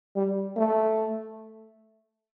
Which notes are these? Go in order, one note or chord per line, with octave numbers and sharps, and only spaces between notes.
G3
A3